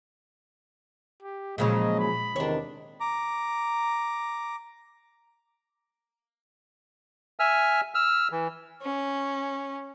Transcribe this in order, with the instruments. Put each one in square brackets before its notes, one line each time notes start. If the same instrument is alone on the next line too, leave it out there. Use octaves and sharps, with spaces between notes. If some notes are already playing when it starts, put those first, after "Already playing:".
[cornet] G4
[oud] A#2 C#3 F#3 [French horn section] F3 G#3 [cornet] D#5
[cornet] B5
[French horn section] E2 C3 D#3 [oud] D4 C#5
[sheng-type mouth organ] A#5 D6
[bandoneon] E5 G#5 E6 F6
E6 F6
E3
[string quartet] C#4